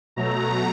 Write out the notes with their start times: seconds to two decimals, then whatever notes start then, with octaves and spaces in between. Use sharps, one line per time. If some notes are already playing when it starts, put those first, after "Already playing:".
0.16 B2 F#3 A3 A#5